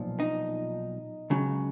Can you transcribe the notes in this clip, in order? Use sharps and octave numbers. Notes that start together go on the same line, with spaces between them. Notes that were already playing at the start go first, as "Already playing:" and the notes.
Already playing: B1 A#2 F3
D#4
C#2 C#3 F#3